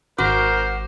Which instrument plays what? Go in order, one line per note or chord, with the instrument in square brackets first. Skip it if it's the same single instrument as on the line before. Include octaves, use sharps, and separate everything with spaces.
[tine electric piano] G#1 D6 [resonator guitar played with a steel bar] F#4 [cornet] A#4 [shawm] C5